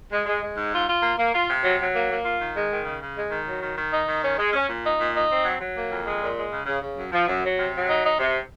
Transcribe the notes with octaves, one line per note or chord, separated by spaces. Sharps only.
G#3
G#3
G#3
G#2
F4
F4
A#3
A#3
F4
C3
F#3
F#3
A#3
A#3
F4
D#3
G#3
D#3
C#3
C#3
G#3
D#3
F#3
D#3
D#3
D#4
D#3
C#4
G#3
C#4
A#2
D#4
A#2
D#4
C4
F#3
F#3
A#3
F2
G#3
A#2
G#3
C#3
C#3
C#3
F#2
F3
F#2
F#3
C3
F#3
D#4
D#4
C3